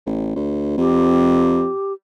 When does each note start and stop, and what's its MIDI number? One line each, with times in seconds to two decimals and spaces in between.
0.06 0.32 33
0.36 0.75 38
0.78 1.68 41
0.78 1.93 67